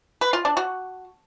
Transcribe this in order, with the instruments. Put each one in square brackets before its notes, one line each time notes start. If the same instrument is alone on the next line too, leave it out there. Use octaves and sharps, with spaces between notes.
[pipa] B4
F4
D4
F#4